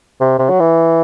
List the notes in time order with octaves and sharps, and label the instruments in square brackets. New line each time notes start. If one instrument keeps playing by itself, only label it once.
[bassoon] C3
C3
F#3
E3